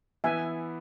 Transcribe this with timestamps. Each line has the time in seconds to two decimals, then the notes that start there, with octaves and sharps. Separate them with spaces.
0.24 E3 B3 E4 B4 E5 G#5